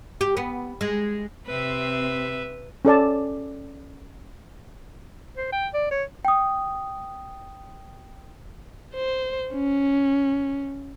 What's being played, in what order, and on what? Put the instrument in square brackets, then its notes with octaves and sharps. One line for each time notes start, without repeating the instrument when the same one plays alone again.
[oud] G4
B3
G#3
[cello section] C3 C4 [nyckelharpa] B4 E5
[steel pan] C#4 A4 D5 A5
[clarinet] C5
G5
D5
C#5
[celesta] G5 D#6
[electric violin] C5
C#4